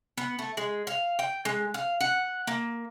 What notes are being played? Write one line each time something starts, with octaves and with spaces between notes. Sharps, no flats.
B3
A3
G#3
F5
G5
G#3
F5
F#5
A#3